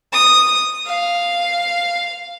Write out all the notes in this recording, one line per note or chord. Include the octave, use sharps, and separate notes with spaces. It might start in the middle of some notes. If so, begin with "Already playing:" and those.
D#6
F5